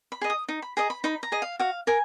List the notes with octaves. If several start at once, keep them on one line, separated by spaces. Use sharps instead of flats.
B5
G#4 D#5
D#6
D#4
B5
G#4 D#5 A#5
B5
D#4 B5
A#5
G#4 D#5
F5
F#4 F5
A#4 G#5